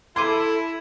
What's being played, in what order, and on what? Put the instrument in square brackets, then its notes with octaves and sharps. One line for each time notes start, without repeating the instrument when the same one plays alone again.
[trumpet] E4 [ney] A4 [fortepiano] C6 D6 [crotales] G#6 D#7